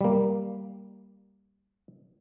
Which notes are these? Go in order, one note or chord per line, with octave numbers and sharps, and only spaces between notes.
G3 A#3